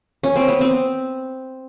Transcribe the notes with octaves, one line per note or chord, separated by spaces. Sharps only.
C#4
C4
B3
C4